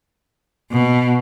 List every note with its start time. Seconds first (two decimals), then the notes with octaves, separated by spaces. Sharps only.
0.72 B2